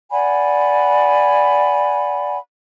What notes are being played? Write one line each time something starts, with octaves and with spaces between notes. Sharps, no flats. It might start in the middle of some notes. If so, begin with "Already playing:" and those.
D5 F#5 G#5 B5